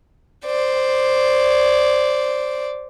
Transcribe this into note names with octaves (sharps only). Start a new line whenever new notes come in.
C5 D5